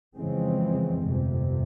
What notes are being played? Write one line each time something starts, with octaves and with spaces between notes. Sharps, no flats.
F2 C#3 E3 G#3 C4
G1 F2 C3